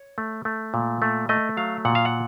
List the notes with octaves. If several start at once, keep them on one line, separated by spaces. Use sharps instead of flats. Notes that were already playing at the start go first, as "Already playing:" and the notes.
Already playing: C#5
A3
A3
A#2
A3
A3 D#5
F#3 F5
A#2 F#5
F5
F#5